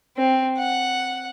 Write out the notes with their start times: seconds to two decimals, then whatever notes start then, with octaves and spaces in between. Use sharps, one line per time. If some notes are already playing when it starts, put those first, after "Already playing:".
0.17 C4
0.58 F#5